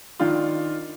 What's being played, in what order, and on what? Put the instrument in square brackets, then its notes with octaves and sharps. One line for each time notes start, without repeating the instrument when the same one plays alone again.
[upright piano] D#3 D4 F4